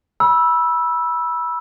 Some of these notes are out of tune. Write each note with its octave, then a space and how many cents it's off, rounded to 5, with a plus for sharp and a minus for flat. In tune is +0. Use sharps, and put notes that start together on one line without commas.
B5 -25 E6 +0